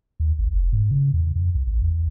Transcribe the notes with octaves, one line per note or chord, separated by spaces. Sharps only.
D#2
G#1
F1
G#2
C#3
E2
F2
C2
A1
E2